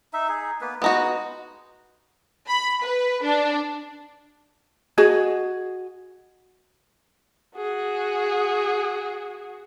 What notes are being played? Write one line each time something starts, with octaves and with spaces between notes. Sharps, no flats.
D#4 E5
D#4 G#4
A#3 B3 B4
G#3 B3 D#4 F#4
B5
B4
D4
F#4 G#4 D#5
F#4 G#4